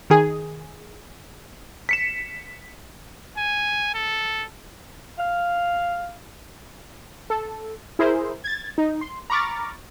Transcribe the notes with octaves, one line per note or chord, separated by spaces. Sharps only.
D#3 G#4
B6 C#7 E7
G#5
A4
F5
A4
E4 G#4 A#4 C5
G#6 A6
D#4
C6
A#5 B5 C#6 D6 F6 A6